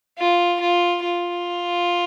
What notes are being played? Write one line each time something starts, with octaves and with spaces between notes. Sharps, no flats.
F4
F4
F4